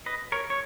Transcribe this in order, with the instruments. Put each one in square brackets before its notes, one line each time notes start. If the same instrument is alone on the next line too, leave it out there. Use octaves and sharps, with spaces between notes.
[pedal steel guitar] B4 D#5
A#4 C#5
C#5